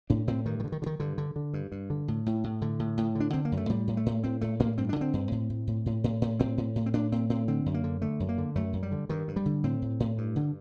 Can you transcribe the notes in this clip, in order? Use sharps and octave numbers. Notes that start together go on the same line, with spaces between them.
A2 D4
A2 C4
G2 D#3
D#3
D3
D#3
D3
D#3
G2 D3
D3
D3
G2
G2
D3
A2
A2
A2
A2 D3
A2
A2
D3
D4
D3 C4
A#3
F#2
A3
A2 G3
A2
A3
A2
A2 C4
A2 A3
A2 A#3
G2 C4
D4
D3
C4
G2
A2
A2
A2
A2
A2
A2
A2 C4
A2
A2
C4
A2 D4
A2 C4
A2 C4
D3 C4
F#2
A#3
D3
D3 A3
F#2
A#3
D3
F#2 A3
F#2
G3
D3
G2 D#3
G2
G3
D3
A2 C4
A2
A2
G2
D3